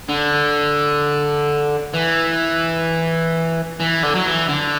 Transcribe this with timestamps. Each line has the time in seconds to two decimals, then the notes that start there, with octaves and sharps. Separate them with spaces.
0.09 D3
1.94 E3
3.80 E3
4.03 D3
4.15 F#3
4.26 E3
4.49 D3